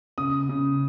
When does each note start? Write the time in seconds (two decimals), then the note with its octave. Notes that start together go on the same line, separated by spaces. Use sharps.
0.18 C#3 D#6
0.49 C#3